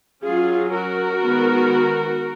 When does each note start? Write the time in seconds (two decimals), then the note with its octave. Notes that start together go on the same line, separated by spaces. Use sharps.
0.23 F#3 C#4 F4 G#4
0.73 F#4 A#4
1.23 D#3 G#3 B3